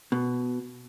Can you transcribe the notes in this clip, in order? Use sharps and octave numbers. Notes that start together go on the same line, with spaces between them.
B2